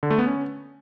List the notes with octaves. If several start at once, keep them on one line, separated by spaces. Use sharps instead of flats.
D3
A3
B3
C#4